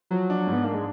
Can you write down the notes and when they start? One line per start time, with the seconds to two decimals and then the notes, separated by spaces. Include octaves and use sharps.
0.11 F3 F#3
0.30 D4
0.47 G#2
0.53 B3
0.64 A#3 D4
0.74 G#3